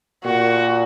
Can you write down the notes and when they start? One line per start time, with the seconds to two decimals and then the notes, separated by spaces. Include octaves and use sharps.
0.25 A#2 F#4